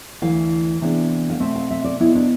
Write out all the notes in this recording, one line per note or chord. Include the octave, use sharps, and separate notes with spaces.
D2 C3 E3 F5
C3 E3 G#3 B3 D4
F5
B2 A3 C4 E5
F5
E5
D5
C3 G#3 B3 E4
D4